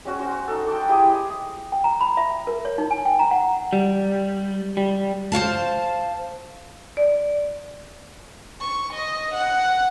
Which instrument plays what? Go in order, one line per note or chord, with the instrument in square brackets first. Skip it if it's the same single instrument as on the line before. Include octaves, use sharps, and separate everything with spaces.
[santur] G#3 C#4 F#4
F#4 C5
D#4 A4
G5 A5 D6
E4 G4 G#4
D#5
[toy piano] G5
A#5
B5
E5
A#4
C#5
D#4
G#5
G5
A#5
F#5
[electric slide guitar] G3
G3
[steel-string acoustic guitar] C5 C#5 F5 A5
[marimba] D5
[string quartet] C#6
D#5
F#5